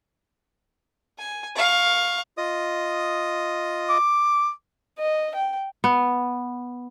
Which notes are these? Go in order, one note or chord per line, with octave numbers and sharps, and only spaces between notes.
G#5
F5 C#6
F4 D#5 D#6
D6
D#5
G5
B3